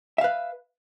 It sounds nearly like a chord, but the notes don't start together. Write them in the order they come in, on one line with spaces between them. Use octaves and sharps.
E5 F5 B4